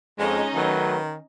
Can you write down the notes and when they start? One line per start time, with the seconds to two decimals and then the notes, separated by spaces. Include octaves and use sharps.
0.19 F2 G#3 C#4 D#4 D#5
0.54 D#3 F#3 A3 B4